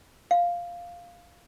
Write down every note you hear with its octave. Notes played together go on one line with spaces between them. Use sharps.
F5